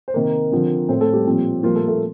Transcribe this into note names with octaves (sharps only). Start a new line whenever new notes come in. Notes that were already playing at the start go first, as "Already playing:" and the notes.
C5
C3 D#3 A#3 A#4
D3 F3 C4
A2 A3 C4 C5
A3 A4
G3 G4
A#2 F3 C4
A#2 F3 G3 A#3 F4
A3 A4
A3 A4